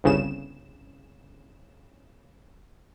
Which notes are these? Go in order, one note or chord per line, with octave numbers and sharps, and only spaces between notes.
G1 C2 C#3 E7